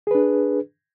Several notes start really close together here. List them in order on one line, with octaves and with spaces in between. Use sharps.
G#4 B4 D4